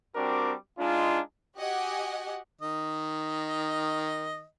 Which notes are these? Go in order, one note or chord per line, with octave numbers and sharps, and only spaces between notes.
G3 C4 D4 F#4 A#4 D6
G#3 D4 D#4 F4
F#4 G4 D#5 F#5 G#5
D#3 D#5